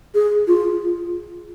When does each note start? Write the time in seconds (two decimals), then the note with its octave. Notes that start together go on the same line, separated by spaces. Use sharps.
0.15 G#4
0.48 F4